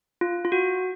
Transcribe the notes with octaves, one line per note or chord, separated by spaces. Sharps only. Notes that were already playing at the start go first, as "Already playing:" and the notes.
F4
F4
F#4